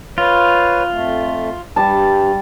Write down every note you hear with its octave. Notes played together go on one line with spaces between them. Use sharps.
F4 B4 C#5
F2 A3
G2 G3 A5